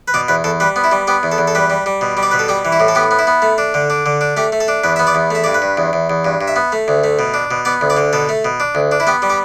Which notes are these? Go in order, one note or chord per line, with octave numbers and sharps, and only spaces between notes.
B4
B2 D5
E2 B4
E2 A4
G3 B4
B3
E4
G3
B3 G4
E2
A4
E2
A4
G3 B4
G3
G3
B2
G3
D5
B2 B4
A4
G3 G4
E3
E4
A2
A4
B3 G4
B3
E4
B3
A3
D4
D3
D4
D3
D4
A3 G4
A3
A4
D4
E2 B4
B3 E5
D5
E2
A3 E5
G2 D5
B4
G2
E2
E2
E2
G2
G2
E5
B3
A3
D2
A3
B2
D4
B2
B3 D5
D2
D5
D3
B2 A4
A3
B2
D4
D2
D4
E4
B3 G4
G3
G4